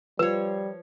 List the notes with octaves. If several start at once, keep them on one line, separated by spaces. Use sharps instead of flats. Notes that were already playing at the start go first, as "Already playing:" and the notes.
F3 G3 B4 C#5